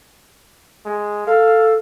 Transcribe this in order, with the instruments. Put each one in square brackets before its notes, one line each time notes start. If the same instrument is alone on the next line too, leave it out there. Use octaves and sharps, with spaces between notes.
[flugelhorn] G#3
[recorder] A4 [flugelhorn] F5